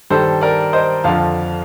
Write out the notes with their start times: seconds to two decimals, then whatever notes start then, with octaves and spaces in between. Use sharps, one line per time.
0.10 G2 D#3 G3 A4 C5
0.41 A#4 D5
0.73 C5 D#5
1.04 F2 D3 F3 F5 A5